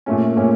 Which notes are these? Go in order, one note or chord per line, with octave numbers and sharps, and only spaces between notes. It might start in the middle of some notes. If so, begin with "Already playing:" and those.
A#2 A3 C#4
A#2 A3 C#4